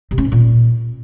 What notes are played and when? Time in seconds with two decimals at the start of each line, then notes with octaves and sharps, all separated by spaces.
0.11 C3
0.18 C#4
0.25 G#2
0.32 A#2